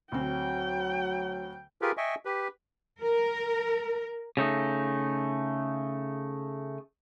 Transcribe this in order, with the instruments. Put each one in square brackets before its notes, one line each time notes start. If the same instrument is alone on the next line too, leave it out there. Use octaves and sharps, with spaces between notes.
[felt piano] D2 C4 [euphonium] F#3 [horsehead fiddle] G5
[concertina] F4 G4 G#4 A#4 B4
D#5 E5 G5 G#5 C#6
G4 B4
[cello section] A#4
[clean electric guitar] C#3 A3 D#4